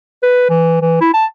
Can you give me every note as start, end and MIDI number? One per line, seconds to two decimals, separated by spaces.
0.23 0.45 71
0.49 0.77 52
0.82 0.98 52
1.01 1.09 64
1.14 1.25 81